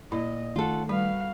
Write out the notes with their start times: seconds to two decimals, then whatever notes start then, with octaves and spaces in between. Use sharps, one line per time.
0.12 A#2 E4 D#5
0.56 D#3 A3 C#4 F4 A4 F#5
0.89 G3 F#4 B4 F5